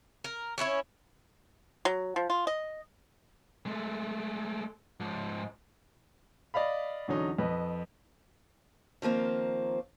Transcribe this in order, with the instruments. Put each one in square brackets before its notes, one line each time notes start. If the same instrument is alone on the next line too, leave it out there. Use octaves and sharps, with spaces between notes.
[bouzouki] A#4
C#4 D4 E4 C#5
[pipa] F#3
F3
F4
D#5
[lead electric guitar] G#3 A3
G#2 F3
[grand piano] D5 D#5 F5 B5
E2 D3 F#3 C#4 D#4
F2 B4 D#5
[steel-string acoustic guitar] D#3 F3 A#3 C4